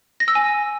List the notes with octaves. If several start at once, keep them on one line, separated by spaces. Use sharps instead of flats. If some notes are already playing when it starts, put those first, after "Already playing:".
A#6
E6
G#5